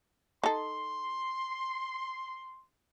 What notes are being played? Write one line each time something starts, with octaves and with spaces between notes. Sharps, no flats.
D#4 A4 C6